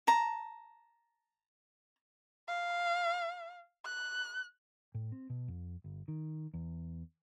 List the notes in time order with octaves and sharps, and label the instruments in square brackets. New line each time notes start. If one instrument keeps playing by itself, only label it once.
[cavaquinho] A5 A#5
[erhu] F5
F#6
[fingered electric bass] A2
C4
B2
F2
G1
D#3
E2